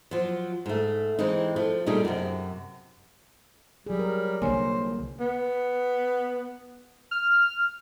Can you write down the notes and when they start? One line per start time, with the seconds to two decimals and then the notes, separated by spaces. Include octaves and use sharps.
0.11 F3 F#3
0.66 G#2 A3
1.19 E3 G#3 C4 D#4
1.56 F3 A3
1.86 A#2 G3 A3 D#4 G#4
2.05 F#2 C3
3.87 F#3 G3 G#4
3.99 A#4
4.42 C2 D3 A#3 C5 C#5 G#5
5.20 B3
7.11 F6